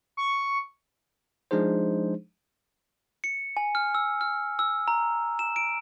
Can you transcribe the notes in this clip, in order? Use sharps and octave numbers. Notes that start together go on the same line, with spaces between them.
C#6
F3 G#3 D4 D#4 G#4 C5
C#7
G#5
F6
E6
F6
E6
A#5
E7
D7